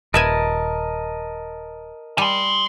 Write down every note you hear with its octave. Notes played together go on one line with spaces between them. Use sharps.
D#1 A#4 B4 D#5 E5 G#5 A5
G3 G#5 C6